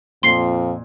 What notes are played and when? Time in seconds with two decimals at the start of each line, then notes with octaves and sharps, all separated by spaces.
0.23 F2 A#2 C6 C7